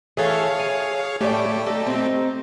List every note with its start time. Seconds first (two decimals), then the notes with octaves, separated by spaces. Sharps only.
0.17 E3 A3 G#4 A4 C#5 F5
0.59 G#5
1.21 A2 A3 G4 C#5 D5
1.66 D#4 A4
1.86 C4 D#4